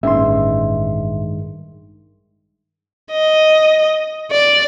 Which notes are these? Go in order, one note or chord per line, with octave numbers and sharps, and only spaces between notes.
A1 G2 D#3 G#3 A#3 C#4 E5 C6
D#5
D5